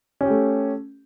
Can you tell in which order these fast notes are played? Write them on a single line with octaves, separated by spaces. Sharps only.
C#4 G4 A3